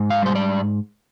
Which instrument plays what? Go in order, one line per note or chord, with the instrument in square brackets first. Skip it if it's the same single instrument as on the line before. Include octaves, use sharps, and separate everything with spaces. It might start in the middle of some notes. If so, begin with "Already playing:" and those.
Already playing: [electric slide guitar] G#2
F5
G3 C5
D5